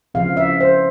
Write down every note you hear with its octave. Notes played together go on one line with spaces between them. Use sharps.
C#3 F3 C4 F5
E5
C5